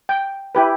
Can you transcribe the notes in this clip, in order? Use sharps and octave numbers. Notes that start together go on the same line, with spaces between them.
G5
E4 G4 B4